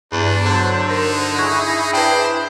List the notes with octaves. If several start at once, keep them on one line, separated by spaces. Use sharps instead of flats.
E2 G2 D4
D3 F#3 C5
D#4 A#4
E4 G#4 C#6 F#6 G#6
D4 B4 C5 G5